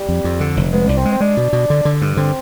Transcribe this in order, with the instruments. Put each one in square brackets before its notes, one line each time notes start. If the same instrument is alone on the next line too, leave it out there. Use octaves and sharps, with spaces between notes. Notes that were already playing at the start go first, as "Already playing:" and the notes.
Already playing: [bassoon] G3
[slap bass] F2
F2
D3
F1
[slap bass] G#3 [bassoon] B3
[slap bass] C2 [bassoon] D4
[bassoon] C4
[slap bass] G#3
[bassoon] C4
[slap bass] G#3 [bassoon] D4
[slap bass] B2
B2
D3
D3
G2
[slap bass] D3 [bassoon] C4